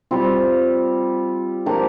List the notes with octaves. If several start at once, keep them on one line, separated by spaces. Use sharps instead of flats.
G3 C4 F4
F3 A#3 D4 G4